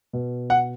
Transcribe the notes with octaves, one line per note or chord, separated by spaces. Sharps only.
B2
F#5